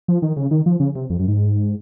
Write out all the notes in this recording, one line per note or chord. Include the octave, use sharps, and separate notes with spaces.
F3
D#3
C#3
D#3
F3
C#3
C3
F2
F#2
G#2